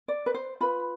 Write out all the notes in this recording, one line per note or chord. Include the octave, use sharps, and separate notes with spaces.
D5
B4
C5
F4 B4 B5